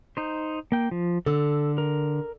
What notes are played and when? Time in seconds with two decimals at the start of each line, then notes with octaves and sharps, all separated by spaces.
0.17 D#4 C5
0.72 A#3 G5
0.91 F3
1.26 D3 A4 E6
1.78 A#4